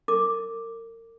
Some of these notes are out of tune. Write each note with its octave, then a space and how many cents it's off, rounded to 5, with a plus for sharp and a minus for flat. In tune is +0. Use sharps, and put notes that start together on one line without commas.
A#4 -35 D6 +0